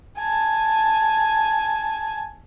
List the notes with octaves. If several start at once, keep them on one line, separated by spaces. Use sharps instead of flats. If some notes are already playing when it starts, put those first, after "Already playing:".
G#5 A5